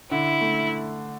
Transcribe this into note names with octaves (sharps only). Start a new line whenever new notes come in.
D3 E4
A3